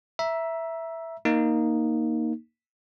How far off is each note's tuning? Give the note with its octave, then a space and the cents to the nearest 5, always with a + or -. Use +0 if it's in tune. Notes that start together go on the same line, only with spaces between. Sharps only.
E5 +0 A#5 +25
A#3 +0 D#4 +0